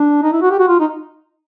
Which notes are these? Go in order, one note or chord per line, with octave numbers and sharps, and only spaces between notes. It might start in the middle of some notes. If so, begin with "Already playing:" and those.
Already playing: D4
D#4
E4
F#4
G4
F#4
F4
D#4